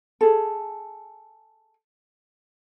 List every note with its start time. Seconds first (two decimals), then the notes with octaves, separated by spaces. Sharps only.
0.21 G#4 A4